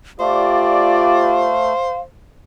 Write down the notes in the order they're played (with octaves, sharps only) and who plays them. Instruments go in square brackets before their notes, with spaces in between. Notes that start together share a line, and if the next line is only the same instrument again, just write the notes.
[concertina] A3 [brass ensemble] F4 G4 D5 [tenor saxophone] C5 [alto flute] F5